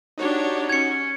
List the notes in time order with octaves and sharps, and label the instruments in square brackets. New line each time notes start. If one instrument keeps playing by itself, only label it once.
[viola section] D4 G4 C#5 [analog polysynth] D#4 F#4
[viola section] C#4 [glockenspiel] G#6 C#7